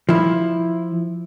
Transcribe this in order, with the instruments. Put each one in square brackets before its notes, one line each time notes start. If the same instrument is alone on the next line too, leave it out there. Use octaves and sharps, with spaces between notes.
[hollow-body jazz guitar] F3 E4